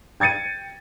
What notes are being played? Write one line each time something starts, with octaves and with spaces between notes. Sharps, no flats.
G5 G#6 A6 C#7 D#7